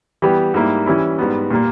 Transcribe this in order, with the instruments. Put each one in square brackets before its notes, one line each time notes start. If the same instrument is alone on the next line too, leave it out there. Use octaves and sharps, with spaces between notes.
[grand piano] E3 G3 B3 G4
G#2 G3 A#3 E4
E3 G3 C#4 E4
G#2 G3 B3
A#2 G3 A#3